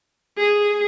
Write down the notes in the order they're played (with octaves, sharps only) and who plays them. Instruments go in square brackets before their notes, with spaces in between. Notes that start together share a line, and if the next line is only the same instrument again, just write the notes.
[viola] G#4